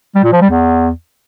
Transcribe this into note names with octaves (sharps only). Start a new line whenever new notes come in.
G3
A#2
F3
G3
E2